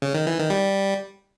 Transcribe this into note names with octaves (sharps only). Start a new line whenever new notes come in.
C#3
D#3
E3
D#3
G3